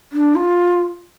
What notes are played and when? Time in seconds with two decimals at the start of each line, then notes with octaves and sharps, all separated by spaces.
0.12 D4
0.35 F4